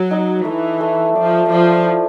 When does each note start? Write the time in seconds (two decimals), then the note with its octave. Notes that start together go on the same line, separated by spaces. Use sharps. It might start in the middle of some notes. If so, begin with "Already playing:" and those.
Already playing: F#3
0.11 D#4
0.45 E3 A3
0.81 A3
1.15 F3 D5
1.49 F3 D5
1.85 E4